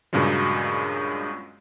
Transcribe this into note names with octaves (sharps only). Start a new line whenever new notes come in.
G2 A#2 C#3 F#3 G#3